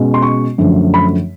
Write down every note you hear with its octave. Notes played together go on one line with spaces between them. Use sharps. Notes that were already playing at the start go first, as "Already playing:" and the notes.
Already playing: B2 G#3 C#4
C6
C#6
F#2 D3 F3 A3
B5